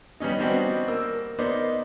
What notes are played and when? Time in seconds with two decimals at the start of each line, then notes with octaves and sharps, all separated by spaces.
0.20 G3 B3 C#4 D#4
0.39 G3 B3 C4 D4 D#4 F#4
0.88 A#3 E6
1.39 A#3 B3 D#4 C5 D5